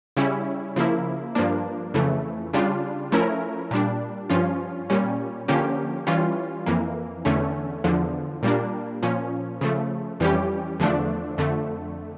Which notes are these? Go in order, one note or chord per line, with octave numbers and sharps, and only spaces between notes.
C#3 G3 C#4 E4
C#3 F3 A#3 E4
G2 F3 A#3 D4
F2 C#3 E3 A3
C#3 G3 D4 F4
F3 A3 C#4 E4 A#4
A#2 G3 D4
G2 F3 C#4 F4
A#2 G3 C#4
D3 F3 A#3 C#4 G4
E3 G3 C#4 F4
F2 E3 A#3
E2 D3 A3 C#4
E2 D3 F3
A#2 G3 A#3 D4
A#2 F3 C#4
C#3 F3 A3
F2 E3 G3 C#4 G4
E2 D3 F3 A3 D4
F2 D3 A3